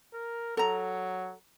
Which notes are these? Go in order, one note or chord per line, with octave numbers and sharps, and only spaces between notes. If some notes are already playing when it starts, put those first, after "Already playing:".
A#4
F#3 A4 A#5